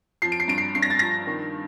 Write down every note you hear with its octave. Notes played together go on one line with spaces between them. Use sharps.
F3 C7
D7
C7
G2 D7
C7
G2 C7
A#6
A6
F3 A#6
D#3